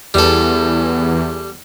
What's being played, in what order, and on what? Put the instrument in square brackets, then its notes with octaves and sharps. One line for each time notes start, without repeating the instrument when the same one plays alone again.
[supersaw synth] E2 [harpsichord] G3 A4